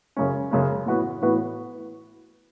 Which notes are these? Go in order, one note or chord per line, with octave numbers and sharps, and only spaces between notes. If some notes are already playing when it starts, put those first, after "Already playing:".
F#2 C#3 G#3 C#4
F#2 C#3 G#3 C#4
A2 E3 B3 F#4 B4
A2 E3 B3 F#4 B4